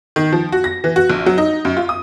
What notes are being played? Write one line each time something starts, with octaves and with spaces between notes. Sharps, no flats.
D#3
F3
F#4
A#6
E3
F#4
A#1
F#3
D#4
F#2
F4
D#6